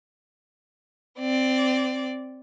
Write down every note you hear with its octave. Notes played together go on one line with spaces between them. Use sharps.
C4 D5